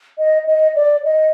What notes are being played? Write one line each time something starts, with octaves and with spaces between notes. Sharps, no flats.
D#5
D#5
D5
D#5